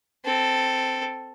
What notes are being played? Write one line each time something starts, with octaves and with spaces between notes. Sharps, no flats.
C4 A4